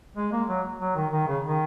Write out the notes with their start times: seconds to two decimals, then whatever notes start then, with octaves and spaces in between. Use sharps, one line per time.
0.17 G#3
0.32 A#3
0.49 F#3
0.81 F#3
0.96 D#3
1.12 D#3
1.27 C#3
1.44 D#3